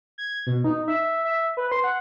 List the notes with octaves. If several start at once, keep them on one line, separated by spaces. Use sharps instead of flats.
G#6
B2
D#4
E5
E5
B4
C6
F#5